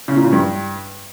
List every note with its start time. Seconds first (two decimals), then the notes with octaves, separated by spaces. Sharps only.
0.08 C#3
0.16 A#2
0.24 C#3
0.33 G2